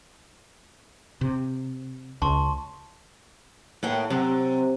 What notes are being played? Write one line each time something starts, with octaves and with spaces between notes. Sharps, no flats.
C3
C#2 A5 C6 C#6
A2 A#3 F#5 G5
C3 F#3